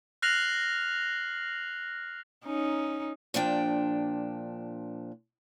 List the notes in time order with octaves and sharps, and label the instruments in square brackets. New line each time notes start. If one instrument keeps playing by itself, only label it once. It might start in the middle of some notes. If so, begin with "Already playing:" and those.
[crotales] F6 F#6 A#6 C7 F7 F#7
[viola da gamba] C#4 D#4
[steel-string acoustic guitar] A#2 F3 D4 G5